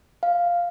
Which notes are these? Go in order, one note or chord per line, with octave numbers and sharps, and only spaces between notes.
F5